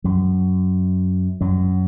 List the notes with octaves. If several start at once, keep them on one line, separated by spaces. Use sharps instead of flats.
F#2 F#3
F#2 F#3